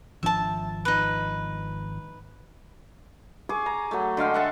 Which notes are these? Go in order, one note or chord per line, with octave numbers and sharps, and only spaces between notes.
G#1 F3 D4 E5 A5
D#4 B4
G#4 C#6 D6
A#5
F#3 A3
D3 G#3 F5 G5
A4 E5 F#5